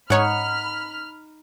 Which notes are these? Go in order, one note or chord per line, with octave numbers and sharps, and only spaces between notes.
G#2 D#4 C#5 F#5 B5 F6